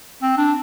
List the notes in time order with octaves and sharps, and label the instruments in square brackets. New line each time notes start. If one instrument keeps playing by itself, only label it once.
[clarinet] C4
D4